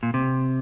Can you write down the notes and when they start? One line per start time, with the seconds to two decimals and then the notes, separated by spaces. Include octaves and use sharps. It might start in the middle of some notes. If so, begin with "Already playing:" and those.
0.03 A#2
0.14 C3